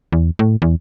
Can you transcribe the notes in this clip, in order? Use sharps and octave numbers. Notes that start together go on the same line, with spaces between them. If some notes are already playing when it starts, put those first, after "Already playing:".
E2
A2
E2